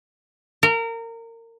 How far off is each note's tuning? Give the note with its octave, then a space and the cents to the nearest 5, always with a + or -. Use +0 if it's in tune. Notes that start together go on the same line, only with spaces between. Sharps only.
A#4 -25